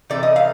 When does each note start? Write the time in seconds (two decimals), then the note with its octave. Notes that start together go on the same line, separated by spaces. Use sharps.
0.10 C3 E3 A3 D5
0.23 D#5
0.36 F5